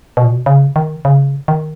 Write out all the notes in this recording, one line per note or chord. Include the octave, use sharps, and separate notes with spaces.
B2
A#2
B2
C#3
D#3
C#3
D#3